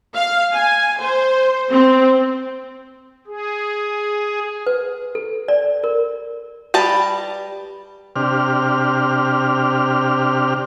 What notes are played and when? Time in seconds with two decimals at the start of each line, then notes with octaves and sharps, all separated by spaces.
0.16 F5
0.54 G#5
1.01 C5
1.71 C4
3.27 G#4
4.67 B4
5.15 A4
5.48 D5
5.84 A#4
6.74 G3 B4 A5 A#5
8.16 C3 D4 G4 F6